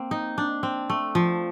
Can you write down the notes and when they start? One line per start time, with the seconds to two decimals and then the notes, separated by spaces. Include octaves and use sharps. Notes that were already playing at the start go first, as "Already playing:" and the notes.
Already playing: A#3 C4
0.11 D#4
0.38 D4
0.63 C4
0.90 A3
1.15 F3